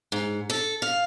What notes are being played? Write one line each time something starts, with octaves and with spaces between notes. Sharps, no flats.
G#2
A4
F5